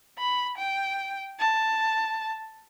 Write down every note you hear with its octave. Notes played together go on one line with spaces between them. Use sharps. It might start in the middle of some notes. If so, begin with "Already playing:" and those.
B5
G5
A5